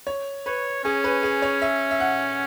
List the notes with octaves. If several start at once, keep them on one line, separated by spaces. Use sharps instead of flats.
C#5
B4 C#5
C#4 G#4
B4
G#4
C#5
E5
E5
F#5